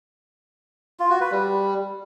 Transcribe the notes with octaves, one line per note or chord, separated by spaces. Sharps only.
F4
F#4
B4
G3